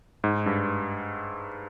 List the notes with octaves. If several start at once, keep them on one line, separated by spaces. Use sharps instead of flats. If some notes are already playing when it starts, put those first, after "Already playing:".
G#2
G2